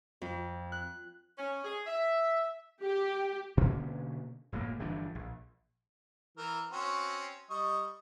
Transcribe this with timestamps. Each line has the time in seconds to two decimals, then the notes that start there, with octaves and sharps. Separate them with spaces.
0.22 F2
0.72 F#6
1.38 C#4
1.65 G#4
1.87 E5
2.82 G4
3.57 B2 D3 A#3 C#4
4.52 F#1 A2 C#3 A#3
4.79 G1 E3 F3 D4
5.15 A#1
6.37 E3 A#4
6.72 C4 C#4 F#4
7.50 G3 D#5 C#6